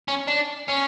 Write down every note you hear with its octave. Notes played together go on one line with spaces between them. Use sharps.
C#4
D4
C#4